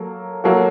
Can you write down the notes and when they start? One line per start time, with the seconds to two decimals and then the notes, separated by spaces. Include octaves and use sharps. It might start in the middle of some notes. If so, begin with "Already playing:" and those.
Already playing: F#3 A#3 A4
0.44 F#3 A#3 F#4 A4